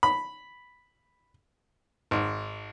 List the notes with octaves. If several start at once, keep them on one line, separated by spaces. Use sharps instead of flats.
B5
G#1